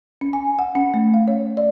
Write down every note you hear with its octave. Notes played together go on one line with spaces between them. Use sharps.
C#4
G#5
F#5
C#4
A3
F5
C#5
D5